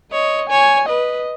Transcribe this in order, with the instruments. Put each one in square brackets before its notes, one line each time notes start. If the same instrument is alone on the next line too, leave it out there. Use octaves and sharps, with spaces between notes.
[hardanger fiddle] C#5 [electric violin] D#5
[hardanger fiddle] C#5 [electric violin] G#5
[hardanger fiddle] B4 [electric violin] D#5